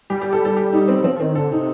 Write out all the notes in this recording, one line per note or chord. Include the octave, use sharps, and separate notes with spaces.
G3 G4
G4
A4
A4
G4
D#4
C4
F3 C4
D#3 C4
D3 A4
C3 D#4